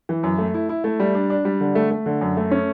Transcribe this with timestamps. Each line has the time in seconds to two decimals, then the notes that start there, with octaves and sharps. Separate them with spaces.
0.09 E3
0.23 F#2
0.38 A3
0.54 E4
0.69 E4
0.84 A3
1.00 G3
1.15 D4
1.30 D4
1.45 G3
1.60 D3
1.75 A3
1.91 A3
2.06 D3
2.21 F#2
2.37 A3
2.51 C#4